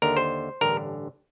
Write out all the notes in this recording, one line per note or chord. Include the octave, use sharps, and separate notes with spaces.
D#2 D3 A#4
C5
A1 G2 D3 A#4